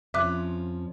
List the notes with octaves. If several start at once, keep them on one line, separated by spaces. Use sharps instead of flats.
F2 F3 C#4 E5 D6 F#6